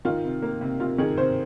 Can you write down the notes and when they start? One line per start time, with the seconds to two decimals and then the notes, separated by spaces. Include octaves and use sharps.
0.05 D#3 F4
0.24 C3
0.42 A#3
0.61 C3
0.80 C3 F4
0.98 D#3 G#4
1.18 C3 C5